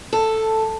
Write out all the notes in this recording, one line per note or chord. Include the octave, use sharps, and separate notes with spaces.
A4